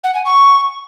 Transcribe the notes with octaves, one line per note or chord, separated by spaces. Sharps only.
F#5
G#5
C#6